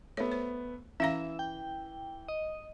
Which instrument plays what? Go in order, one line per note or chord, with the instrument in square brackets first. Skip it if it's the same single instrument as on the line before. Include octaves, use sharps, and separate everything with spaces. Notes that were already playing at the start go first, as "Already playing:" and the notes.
[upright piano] A3 B3 [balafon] C#5
[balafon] C5
[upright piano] E3 A#6 [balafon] C#4 F5 A#5 [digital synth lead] E5
[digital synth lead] G5
D#5